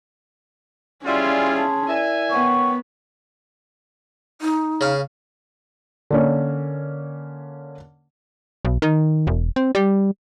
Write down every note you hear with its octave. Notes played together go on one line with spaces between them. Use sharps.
G3 C#4 E4 F4 G#4 D5 G#5 C6
A5 C6
E4 A#4 D5 E5 G#5
B3 A#4 C#5 F#5 G5
D#4
C#3 F5
D3 A#3 C#4
B1
D#3
E1
C4
G3